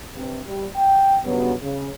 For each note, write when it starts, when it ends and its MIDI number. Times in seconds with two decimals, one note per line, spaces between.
0.16 0.40 43
0.16 0.40 48
0.46 0.66 55
0.76 1.17 79
1.24 1.53 43
1.24 1.53 49
1.24 1.53 54
1.24 1.53 59
1.62 1.90 49